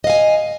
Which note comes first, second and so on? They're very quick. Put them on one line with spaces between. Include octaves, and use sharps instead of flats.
D#5 F5 G#5